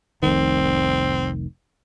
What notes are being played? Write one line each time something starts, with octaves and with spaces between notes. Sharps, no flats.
F1 C2 D#3 C4